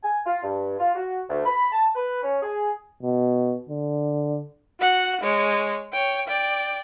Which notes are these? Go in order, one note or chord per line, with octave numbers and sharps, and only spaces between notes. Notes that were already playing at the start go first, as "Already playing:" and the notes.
G#5
F4
G2
F4
F#4
D2
B5
A5
B4
C#4
G#4
B2
D3
F#4 F#5
G#3 C#5
C#5 G5
D5 G5